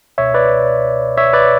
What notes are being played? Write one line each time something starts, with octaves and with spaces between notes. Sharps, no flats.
C#2 B2 C#5 E5
B4 D5
C#5 E5
B4 D5